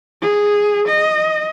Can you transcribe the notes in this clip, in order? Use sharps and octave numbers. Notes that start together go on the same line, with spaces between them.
G#4
D#5